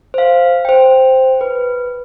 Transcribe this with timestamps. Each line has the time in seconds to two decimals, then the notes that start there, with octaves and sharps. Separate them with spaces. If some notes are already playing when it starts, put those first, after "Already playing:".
0.14 C5 F5
0.65 C5 G5
1.41 B4